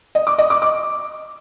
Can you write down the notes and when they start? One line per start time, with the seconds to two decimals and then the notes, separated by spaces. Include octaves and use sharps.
0.15 D#5
0.27 D6
0.39 D#5
0.50 D6
0.62 D6